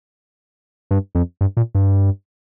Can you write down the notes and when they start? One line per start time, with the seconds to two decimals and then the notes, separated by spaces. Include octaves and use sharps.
0.91 G2
1.15 F2
1.41 G2
1.57 A#2
1.75 G2